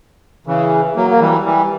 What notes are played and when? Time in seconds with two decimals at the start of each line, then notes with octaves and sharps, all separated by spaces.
0.47 C#3 E3
0.96 F#3 A#3
1.10 A#3
1.20 E3 G3
1.45 E3 G3